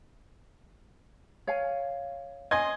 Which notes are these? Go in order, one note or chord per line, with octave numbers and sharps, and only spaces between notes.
C#5 F5 G#5
C#4 D#5 G#5 C6 G#6